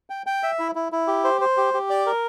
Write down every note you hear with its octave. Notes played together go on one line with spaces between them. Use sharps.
G5
G5
E5
E4
E4
E4
G4
C5
C5
G4
G4
D5
A#4